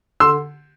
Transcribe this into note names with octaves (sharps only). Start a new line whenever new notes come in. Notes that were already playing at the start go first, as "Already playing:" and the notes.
D3 C6 E6